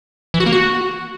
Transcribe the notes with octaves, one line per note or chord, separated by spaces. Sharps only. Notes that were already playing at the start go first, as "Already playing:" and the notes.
E3
F#4
A#3
F#4